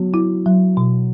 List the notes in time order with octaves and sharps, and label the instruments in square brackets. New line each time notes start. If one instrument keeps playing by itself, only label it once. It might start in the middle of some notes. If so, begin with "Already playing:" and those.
Already playing: [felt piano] F#3 [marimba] B3
[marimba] E4
F#3
B2